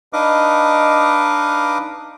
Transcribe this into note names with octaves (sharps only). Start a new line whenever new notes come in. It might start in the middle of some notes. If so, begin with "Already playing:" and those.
D4 D#4 B4 D#5 F5 D6